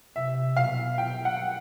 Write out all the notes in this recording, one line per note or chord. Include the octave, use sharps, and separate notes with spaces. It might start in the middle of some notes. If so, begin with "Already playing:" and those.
C3 E5
B2 F5
G5
F#5